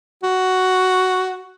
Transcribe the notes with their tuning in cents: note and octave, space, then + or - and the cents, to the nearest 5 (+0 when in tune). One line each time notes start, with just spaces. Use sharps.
F#4 +5